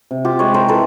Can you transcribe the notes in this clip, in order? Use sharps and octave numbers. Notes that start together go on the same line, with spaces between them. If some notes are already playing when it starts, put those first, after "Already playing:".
C3
F4 G4
G#3 B4 C#5
A#4 C5
E3 A4 B4